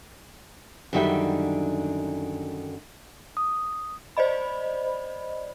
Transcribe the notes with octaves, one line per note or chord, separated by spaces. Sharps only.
F#2 D3 D#3 G3 E5 G5
D#6
C5 D5 D#5 B5